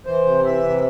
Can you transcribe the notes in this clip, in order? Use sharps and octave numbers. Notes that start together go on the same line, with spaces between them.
E3 C5
C3
E3 E5
C3